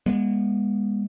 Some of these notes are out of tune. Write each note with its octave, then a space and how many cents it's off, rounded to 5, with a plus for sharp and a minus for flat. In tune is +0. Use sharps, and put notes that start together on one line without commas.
G#3 -30 B3 -30